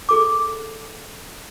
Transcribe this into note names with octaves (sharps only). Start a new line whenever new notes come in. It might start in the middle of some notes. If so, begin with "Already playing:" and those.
G#4 A4 D6